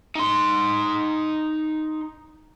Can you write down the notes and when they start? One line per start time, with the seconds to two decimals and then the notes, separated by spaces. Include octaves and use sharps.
0.15 D#4 C6